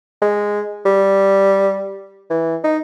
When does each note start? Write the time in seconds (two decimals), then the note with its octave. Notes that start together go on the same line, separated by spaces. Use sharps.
0.22 G#3
0.85 G3
2.30 E3
2.64 D#4